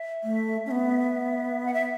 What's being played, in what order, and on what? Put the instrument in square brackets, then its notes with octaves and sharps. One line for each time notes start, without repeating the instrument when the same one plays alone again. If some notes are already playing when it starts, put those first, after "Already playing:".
Already playing: [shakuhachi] E5
[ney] A3
C#4
B3
[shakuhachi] F#5
E5